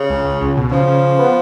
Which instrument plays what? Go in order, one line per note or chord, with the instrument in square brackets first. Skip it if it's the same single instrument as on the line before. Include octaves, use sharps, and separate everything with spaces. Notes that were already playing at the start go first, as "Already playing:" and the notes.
Already playing: [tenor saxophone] C#3
[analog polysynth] C#2
C#2
C#2
B2
[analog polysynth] C#3 [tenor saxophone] F3
[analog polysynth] C#3
C#3
B3